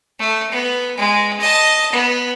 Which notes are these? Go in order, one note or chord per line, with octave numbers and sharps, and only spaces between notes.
A3
B3
G#3
D#5 A5
B3